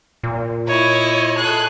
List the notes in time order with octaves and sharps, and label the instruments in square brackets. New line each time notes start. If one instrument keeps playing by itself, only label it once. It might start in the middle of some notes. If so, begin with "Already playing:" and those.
[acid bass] A#2
[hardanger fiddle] E4 D#5 [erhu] C#5
[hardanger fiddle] G#4 A4 [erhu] F#6